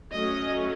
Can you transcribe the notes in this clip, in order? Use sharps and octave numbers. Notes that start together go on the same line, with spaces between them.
F#3 A3 C#4 D#5